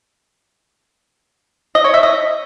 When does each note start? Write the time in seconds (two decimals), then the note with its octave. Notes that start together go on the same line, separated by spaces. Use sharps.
1.75 D#5
1.84 C#5
1.94 E5
2.03 D#5